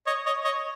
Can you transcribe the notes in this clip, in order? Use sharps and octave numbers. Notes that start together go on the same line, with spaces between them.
C#5 D#5
C#5 D#5
C#5 D#5